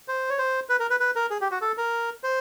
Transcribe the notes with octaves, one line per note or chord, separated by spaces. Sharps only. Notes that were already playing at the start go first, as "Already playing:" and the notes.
C5
C#5
C5
B4
A#4
B4
B4
A#4
G#4
G4
F#4
A4
A#4
C5